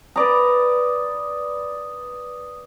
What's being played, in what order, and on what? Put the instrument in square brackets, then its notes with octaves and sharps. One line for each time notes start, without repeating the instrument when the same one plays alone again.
[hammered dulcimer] B4 D5 A#5 [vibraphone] D#6